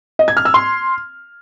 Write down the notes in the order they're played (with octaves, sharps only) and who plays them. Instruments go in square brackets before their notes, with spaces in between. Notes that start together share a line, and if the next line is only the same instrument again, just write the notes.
[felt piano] D#5
G#6
F6
E6
C6